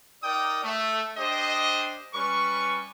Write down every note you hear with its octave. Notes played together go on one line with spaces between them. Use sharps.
D#4 A#4 D5 G5 D#6
A3
D4 G4 C5 D#5
G3 C#4 B4 C#6